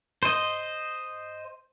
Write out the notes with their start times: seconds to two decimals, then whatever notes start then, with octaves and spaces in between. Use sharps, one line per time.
0.23 C5 D#5